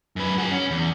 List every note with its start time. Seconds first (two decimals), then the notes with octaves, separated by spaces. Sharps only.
0.16 F#2 B4
0.38 F#4 G#4
0.52 C#4
0.71 E2